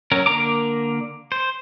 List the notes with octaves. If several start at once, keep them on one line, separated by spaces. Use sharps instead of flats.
F#3 C#4 A#4
D3 A#3 A#4 A#5 D6
C5